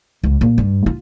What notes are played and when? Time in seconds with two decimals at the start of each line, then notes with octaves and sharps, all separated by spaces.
0.24 C#2
0.41 A#2
0.58 G2
0.86 F4